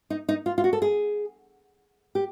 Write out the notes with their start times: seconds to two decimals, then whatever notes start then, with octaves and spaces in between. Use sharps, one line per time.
0.10 D#4
0.29 D#4
0.46 F4
0.58 F4
0.64 F#4
0.73 A4
0.82 G#4
2.15 G4